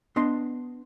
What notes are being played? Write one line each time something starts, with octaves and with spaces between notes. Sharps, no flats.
B3 D4 D#5 C6